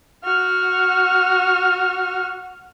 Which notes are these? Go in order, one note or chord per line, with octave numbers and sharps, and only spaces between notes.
F#4 F6